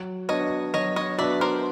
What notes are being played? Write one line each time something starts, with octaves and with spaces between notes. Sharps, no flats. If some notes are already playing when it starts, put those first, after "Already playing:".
Already playing: F#3
B3 D4 F#4 C#5 D#5
F#3 C#5 D#5
C#5 D#5
B3 D4 F#4 D5 E5
A#4 C5